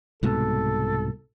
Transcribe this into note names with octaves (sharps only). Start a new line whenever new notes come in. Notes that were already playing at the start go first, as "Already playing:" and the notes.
C2 G#2 B2 A4